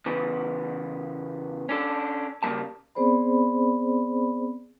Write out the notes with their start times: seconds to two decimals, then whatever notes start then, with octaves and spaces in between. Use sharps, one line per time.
0.06 E2 C#3 E3 B3
1.69 C#4 D4 A4
2.43 C#3 G3 A3 A#3 A5
2.95 B3 C4 G#4 C5 D5 B5